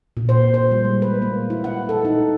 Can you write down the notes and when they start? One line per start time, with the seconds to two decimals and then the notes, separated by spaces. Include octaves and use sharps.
0.17 A#2
0.29 C5
0.54 C5
0.71 G3
0.85 G#3
1.02 B4
1.22 A#3
1.50 E4
1.64 F#5
1.89 A4
2.05 D#4